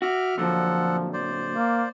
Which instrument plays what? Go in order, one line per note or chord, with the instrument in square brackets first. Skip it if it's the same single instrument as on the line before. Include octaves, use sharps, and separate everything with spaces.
[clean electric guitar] F#4 [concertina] E5 D6 F6
[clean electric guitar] A#2 D3 F#3 [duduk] F3 [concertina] A4 F#5
[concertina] C5 D5
[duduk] A#3